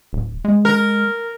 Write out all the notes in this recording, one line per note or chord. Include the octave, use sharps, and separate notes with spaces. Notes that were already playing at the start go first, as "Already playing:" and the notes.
D1
G#3
A#4